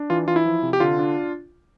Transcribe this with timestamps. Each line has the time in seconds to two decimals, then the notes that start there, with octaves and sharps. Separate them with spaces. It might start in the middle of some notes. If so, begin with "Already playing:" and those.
Already playing: D4
0.10 E3 F4
0.27 E3 F4
0.36 E4
0.45 F3
0.63 C3
0.73 G4
0.80 D3 F4
0.99 D4